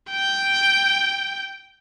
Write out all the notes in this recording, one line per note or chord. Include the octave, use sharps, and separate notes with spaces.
G5